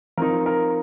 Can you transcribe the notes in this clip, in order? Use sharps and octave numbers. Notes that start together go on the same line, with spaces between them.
F3 C4 D#4 A#4
A#4